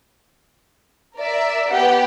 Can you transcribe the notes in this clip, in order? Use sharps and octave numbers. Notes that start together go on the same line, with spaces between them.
A#4 D5 E5
B3 G4 F#5